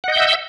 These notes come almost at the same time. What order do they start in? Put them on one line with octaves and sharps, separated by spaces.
F#5 D#5 G6 E5 E6